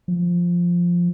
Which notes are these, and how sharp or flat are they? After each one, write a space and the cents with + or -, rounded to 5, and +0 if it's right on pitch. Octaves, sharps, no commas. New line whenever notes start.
F3 +0